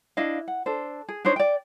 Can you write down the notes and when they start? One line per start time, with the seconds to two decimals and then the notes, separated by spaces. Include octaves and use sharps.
0.17 D4 E4 D#5 F5
0.48 F#5
0.66 D4 A4 C5
1.09 G#4
1.25 D4 D#4 C5 C#5
1.36 D5 G5